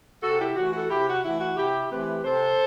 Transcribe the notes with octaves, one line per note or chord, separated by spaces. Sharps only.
C3 F#4 A4
E4 G4
E3 A3 F#4
F#4 A4
C3 E4 G4
F#4
E3 A3 E4
F#4
C3 E4 G4
E3 A3 C4 G4 B4
C3 A4 C5